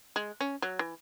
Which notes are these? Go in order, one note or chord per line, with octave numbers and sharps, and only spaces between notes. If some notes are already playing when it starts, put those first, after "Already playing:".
G#3
C#4
F#3
E3